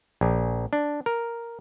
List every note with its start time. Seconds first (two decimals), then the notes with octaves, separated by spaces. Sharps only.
0.21 A#1
0.73 D4
1.06 A#4